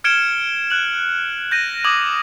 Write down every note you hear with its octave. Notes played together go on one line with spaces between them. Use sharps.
F6 G#6 C#7 D7 E7 G7
F#6 F#7
G6 A#6 D#7
D6 D#6 G#6 F#7